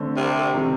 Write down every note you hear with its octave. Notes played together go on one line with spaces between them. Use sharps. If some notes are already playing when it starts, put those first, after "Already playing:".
Already playing: D3 A3 C4
C3
C3 D#3 G3